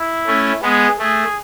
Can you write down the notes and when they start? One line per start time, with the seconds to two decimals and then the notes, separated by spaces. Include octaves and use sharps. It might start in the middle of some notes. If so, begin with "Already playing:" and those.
Already playing: E4
0.27 A3 C#4
0.62 G#3 B3 G#4
0.99 A3 G#4